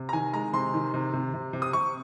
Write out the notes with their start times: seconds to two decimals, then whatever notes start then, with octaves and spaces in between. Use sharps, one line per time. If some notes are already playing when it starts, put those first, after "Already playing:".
Already playing: C3
0.09 A#5
0.13 D#3 G#5
0.33 G#3 A#5
0.53 C3 C6
0.74 D#3
0.94 C3
1.13 C3
1.34 C3
1.53 C3
1.62 D#6
1.73 C3 C#6